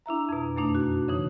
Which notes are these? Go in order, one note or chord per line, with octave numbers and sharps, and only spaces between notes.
D4 E4 E5 A#5
F2 B2
F#2 B2 A3 D4 D#4
F#4
C#3 E3 D#4